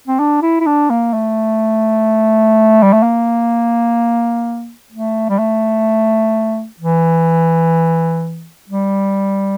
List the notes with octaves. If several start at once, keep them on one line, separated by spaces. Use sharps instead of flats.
C4
D4
E4
E4
D4
A#3
A3
G3
A3
A#3
A3
G3
A3
E3
G3